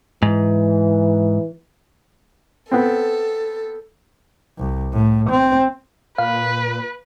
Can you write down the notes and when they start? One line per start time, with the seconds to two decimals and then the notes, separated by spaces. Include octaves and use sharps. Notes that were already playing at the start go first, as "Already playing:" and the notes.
0.23 G#2 E3
2.71 B3 C4 A4
4.58 C2
4.93 A2
5.30 C4
6.18 A#2 B4 F5